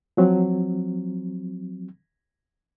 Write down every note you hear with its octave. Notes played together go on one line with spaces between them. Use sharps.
F3 F#3 C4